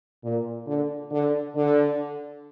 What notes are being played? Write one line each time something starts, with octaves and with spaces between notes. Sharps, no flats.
A#2
D3
D3
D3